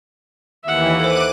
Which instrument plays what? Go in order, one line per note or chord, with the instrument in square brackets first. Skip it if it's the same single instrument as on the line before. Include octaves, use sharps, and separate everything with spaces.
[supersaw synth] D#2 E3 [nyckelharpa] E5 F#5
[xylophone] A4 C5 [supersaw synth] D6 F#6 D#7